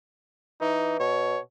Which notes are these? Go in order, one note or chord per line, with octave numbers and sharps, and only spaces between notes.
E3 D#4
B2 C#5